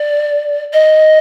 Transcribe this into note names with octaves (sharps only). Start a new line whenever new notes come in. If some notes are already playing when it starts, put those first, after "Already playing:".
Already playing: D5
D#5